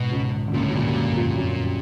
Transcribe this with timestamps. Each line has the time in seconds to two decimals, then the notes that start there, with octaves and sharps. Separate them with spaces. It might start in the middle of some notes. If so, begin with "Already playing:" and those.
Already playing: G#2 B2
0.11 C#2 C#3
0.48 D3
0.53 C#2 A#2 C#3
0.63 A2
0.69 F#3
0.73 G2 A#2 G3
0.95 F#2 F#3
1.15 F2 F3
1.35 F#2 F#3
1.63 G3